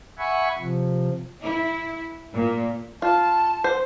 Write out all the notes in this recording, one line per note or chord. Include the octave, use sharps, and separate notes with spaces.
E5 F#5 G#5 B5 C#6
C3 F3
E4
A#2
F4 A5
C5